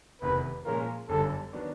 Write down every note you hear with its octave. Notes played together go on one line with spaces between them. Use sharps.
F1 E2 C3 D#3 B4
A#2 F3 G#3 C#4 F4 A#4
G1 F#2 D3 G3 A4
D#3 F#3 B3 D4